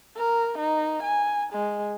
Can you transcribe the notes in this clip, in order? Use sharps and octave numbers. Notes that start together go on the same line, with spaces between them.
A#4
D#4
G#5
G#3